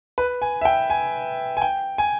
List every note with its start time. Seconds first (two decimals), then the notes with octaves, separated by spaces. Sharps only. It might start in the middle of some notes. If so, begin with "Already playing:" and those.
0.18 B4
0.42 G#5
0.61 E5
0.65 G5
0.90 G#5
1.57 G#5
1.62 G5
1.98 G#5